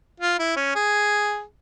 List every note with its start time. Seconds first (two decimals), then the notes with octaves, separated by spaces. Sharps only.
0.20 F4
0.39 E4
0.56 C#4
0.75 G#4